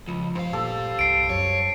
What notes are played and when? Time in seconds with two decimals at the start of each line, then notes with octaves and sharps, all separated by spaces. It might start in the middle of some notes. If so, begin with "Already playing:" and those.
0.08 C#2 F3
0.35 G2 C5 F5
0.53 A#2 G4 A4
0.99 C2 C7 D7
1.30 F#2 C#5